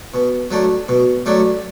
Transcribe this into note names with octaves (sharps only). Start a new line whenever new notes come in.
B2
F#3 A3 D4
B2
F#3 A3 D4